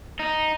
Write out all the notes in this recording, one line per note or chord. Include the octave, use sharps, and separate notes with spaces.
D#4